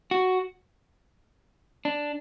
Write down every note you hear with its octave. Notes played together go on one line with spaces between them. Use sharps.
F#4
D4